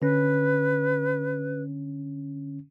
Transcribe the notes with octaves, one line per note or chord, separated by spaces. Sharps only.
D3 C#4 B4